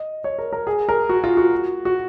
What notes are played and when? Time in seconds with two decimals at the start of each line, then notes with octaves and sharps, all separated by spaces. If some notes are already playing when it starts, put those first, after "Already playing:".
Already playing: D#5
0.24 C#5
0.38 A#4
0.53 A#4
0.67 G#4
0.89 A#4
1.09 F#4
1.24 F4
1.37 F#4
1.85 F#4